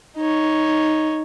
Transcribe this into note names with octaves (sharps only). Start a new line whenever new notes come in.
D#4 C#5